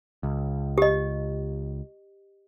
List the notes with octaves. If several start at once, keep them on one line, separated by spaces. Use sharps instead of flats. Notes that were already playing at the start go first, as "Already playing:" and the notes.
C#2
G4 D#5